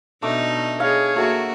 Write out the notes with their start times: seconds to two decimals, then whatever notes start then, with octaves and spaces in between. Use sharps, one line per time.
0.22 B2 A3 D4 D#4 D6
0.80 G#4 C#5 F5 B5
1.16 F#3 A3 A#3 F#4